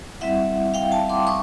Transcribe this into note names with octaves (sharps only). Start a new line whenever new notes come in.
G3 C4 E4 E5 F#5
F5 G5
G5 A5
C6 D6
C#6 D#6